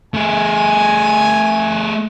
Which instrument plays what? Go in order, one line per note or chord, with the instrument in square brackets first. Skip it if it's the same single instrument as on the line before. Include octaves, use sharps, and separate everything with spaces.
[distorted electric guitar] A3 G#4 [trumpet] G#5